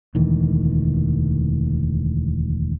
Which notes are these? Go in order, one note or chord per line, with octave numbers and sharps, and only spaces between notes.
E1 D2 D#3 E3